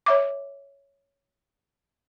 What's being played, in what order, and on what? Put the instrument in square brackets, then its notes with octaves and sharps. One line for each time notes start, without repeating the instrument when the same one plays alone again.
[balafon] C#5 E5 D6